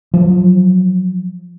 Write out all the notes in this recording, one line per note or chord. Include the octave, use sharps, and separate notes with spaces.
F3 F#3